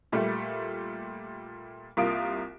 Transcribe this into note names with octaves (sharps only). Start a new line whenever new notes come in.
A#2 G3 A3
C2 A#3 F4 D#6 D7